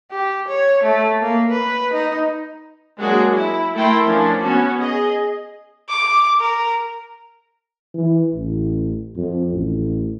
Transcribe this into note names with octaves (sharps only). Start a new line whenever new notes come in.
G4
C#5
A3
A#3
B4
D#4
F#3 G#3 A#3 D4 F#4 G#4
E4
A3 E4 A#4 G5 C6
F3 C#4 D4
B3 C#4 F#4
G#4 D#5
D6
A#4
E3
A1
F2
A1